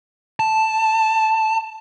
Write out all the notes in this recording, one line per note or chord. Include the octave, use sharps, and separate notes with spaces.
A5